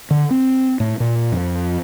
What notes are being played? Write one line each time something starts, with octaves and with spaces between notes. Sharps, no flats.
D3
C4
A2
A#2
F2